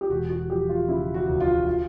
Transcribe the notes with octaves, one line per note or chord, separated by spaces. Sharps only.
G4
E1 F#4
F#4
F3 G4
F4
C#3 E4
F#4
D2
F4
F4